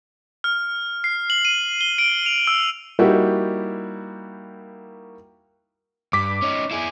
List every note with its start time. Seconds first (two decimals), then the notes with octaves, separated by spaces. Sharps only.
0.44 F6
1.04 C7
1.30 F#7
1.45 D#7
1.81 G7
1.98 D7
2.26 F7
2.47 E6
2.99 G3 A#3 D#4 E4 F#4 G4
6.13 G2 D6 B6
6.42 C#4 D#4
6.71 E4 G#4